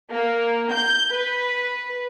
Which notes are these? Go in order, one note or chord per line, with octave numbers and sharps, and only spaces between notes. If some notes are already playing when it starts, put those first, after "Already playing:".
A#3
G6
B4